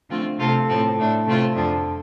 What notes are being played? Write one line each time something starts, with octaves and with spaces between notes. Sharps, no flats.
D3 F3 A3 C4 F4
C3 A3 C4 F4 A4
A2 F3 C4 A4
A2 A3 D4
C3 A3 C4 F4
F2 D3 F3 D4